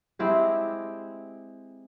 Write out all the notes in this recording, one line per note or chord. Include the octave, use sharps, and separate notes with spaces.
G#3 C4 E4 G4